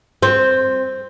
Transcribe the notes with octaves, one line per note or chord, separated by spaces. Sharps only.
C4